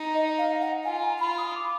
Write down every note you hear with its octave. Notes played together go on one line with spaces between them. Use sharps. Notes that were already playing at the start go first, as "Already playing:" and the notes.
Already playing: D#4
D#5
F5
F#5
F4 G#5
A#5
F4 B5
D#6
D6